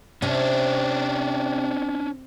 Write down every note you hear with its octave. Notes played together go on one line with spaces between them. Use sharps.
C3 C#4 D4